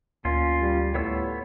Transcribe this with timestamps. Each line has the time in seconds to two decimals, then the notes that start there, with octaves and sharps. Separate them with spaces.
0.25 D2 A#2 C#4 F4
0.61 G3
0.95 A2 B3 C#5 E6